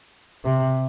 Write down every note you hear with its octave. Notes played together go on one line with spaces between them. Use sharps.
C3